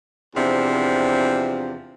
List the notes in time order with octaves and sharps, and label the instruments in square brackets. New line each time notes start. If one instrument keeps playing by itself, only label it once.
[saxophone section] E2 C3 F3 D4